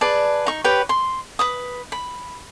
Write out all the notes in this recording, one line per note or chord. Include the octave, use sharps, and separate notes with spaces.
G#4 B4 D5 A5
D#4 C#6
G4 B4 C#5 G5
C6
B4 B5 D#6
B5